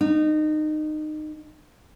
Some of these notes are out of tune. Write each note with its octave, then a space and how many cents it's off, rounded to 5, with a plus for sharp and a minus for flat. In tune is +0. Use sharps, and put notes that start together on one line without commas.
D#4 -25